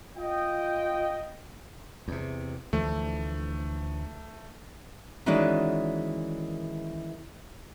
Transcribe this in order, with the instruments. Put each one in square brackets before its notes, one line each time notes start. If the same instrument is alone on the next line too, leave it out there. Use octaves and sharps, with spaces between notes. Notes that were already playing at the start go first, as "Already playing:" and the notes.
[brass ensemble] F4 D#5 G5
[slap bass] E2 C3
[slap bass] D2 E3 F3 [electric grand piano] A3
[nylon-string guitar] D#3 E3 G#3 C#4 F#4 D5